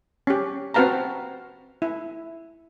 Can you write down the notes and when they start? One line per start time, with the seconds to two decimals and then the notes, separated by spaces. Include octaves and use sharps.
0.27 C#4 G4
0.74 C4 F#4 B4 F5 A5 A#5
1.82 E4